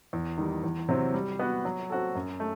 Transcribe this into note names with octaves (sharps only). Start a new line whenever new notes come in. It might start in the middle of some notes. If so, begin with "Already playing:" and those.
E2
D#3 G3
E2
C3 F#3 C4
G3
B3 F#4
F#3
C4 F#4 A4
F#2
A3